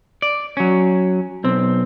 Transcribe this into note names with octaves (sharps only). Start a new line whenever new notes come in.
D5
F#3 C#4
B1 C4